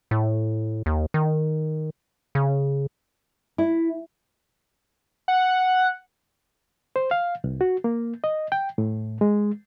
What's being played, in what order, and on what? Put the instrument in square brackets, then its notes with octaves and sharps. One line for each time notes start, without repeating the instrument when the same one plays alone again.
[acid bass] A2
D#2
D#3
C#3
[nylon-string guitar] E4
[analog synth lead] F#5
[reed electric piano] C5
F5
C2
F#4
A#3
D#5
G5
A2
G#3